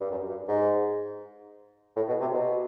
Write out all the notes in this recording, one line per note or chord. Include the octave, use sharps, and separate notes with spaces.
G2
F#2
G2
G#2
A2
B2
C3
B2